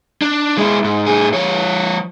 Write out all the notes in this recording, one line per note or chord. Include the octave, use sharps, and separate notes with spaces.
D4
G#3 E4
G#2
A2 G#4
F3 C#5